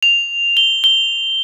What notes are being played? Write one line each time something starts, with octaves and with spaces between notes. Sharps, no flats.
F7
G7
G7